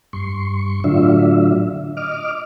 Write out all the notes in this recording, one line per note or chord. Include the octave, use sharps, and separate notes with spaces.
G2 C6 C#6
A2 D3 F#3 D4 F4 E5
D#5 D6 F6